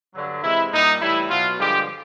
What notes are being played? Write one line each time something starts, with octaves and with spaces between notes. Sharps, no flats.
G2 D3 F#3
C3 E3 G#3 E4
A#2 G3 D#4
A2 E3 G3 E4
B2 F#3 F4
G2 D3 F3 G#3 G4